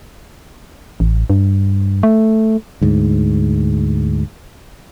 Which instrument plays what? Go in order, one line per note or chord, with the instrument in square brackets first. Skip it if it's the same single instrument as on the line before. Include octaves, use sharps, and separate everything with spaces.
[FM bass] A1
G2
A3
[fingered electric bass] D2 G#2